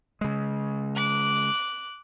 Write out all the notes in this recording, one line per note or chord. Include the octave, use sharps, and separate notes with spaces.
C#3 G#3
D6 F#6